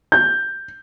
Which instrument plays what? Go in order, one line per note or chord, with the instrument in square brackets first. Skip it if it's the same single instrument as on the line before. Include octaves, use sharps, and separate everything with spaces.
[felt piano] G6